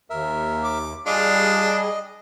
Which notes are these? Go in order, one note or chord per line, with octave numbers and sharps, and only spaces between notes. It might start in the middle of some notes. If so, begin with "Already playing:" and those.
D#2 A#4 E5
D6
G3 D4 F4 G#4 D#5